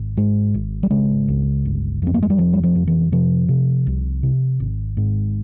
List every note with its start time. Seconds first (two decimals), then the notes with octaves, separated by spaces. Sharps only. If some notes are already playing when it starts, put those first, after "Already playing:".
Already playing: G#1
0.17 G#2 G#3
0.54 G#1
0.83 G3
0.91 C#3 G#3
1.28 C#2
1.65 G1
2.02 F2 C4
2.14 A#3
2.23 G#3
2.30 G3
2.38 F1 F3
2.53 G3
2.63 F3
2.75 F2
2.87 E3
3.12 C3 F3
3.49 C3
3.87 C2
4.23 C3
4.60 G#1
4.97 G#2